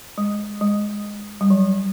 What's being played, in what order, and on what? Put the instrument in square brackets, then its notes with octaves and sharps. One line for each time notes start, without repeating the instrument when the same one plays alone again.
[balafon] G#3
G#3
G3
F#3